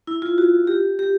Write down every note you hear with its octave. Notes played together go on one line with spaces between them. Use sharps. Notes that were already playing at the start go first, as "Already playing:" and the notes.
E4
F4
F#4
G4
G4